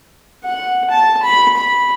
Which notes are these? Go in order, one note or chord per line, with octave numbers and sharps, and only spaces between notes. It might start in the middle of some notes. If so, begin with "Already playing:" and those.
F#5
A5
B5
B5